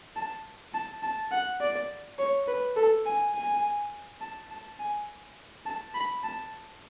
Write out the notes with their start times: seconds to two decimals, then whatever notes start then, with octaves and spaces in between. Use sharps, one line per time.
0.16 A5
0.74 A5
1.03 A5
1.32 F#5
1.61 D5
2.19 C#5
2.48 B4
2.76 A4
3.06 G#5
3.34 G#5
4.21 A5
4.50 A5
4.79 G#5
5.66 A5
5.95 B5
6.24 A5